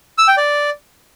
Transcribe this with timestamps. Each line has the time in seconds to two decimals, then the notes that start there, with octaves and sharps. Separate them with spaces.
0.18 E6
0.28 G5
0.37 D5